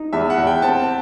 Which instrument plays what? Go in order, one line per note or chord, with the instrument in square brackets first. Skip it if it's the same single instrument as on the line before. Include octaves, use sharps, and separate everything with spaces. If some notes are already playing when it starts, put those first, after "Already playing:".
Already playing: [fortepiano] D#4
[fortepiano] E2 [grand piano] E5
[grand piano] F#5
[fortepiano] E2
[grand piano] G5
[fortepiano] C4 [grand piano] A5